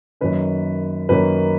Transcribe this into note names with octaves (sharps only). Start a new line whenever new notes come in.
F#2 D#3 A#3 C#4 B4
F#2 D#3 A#3 C#4 B4